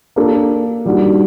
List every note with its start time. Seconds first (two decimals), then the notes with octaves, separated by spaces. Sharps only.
0.16 A#3 D4 A4
0.85 D#3 G3 D4 F#4